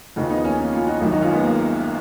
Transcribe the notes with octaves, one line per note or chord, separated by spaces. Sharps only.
D#2 C#3 F3 D#4 F#4
B3 D#4
A#3 C#4
A#3 C#4
C#4 F4
D#4 F#4
G#1 F#2 D#3 F#3
D#4 F#4
C#4 F4
G#3 B3
A#3